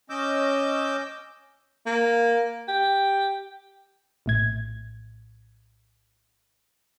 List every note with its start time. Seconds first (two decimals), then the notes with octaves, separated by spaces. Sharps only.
0.10 C#4 D#5 D6 E6 G6
1.87 A#3
2.69 G4
4.26 A#1 A2 G#6